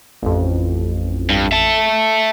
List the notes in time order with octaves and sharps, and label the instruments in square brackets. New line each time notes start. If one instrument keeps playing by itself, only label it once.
[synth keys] A1 F2
[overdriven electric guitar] G2
E5 A5